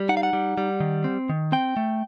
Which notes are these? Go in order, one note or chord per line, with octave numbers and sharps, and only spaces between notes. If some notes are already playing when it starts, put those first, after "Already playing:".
Already playing: G3
D#4 F#5
F5
F#5
G3
G3
D#3
C4
D#3
C4 G5
A3